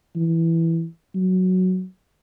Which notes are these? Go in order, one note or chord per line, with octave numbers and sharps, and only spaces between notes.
E3
F#3